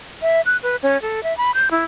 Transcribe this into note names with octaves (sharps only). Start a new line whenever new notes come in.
E5
F#6
B4
C#4
A4
E5
B5
G6
E4